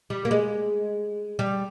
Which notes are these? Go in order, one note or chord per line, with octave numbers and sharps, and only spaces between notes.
G3
A#3
G#3
G3